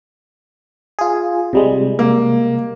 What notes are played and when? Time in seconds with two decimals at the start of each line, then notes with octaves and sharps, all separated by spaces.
0.99 F4 G#4
1.53 C3 G3 G#3
1.99 A#3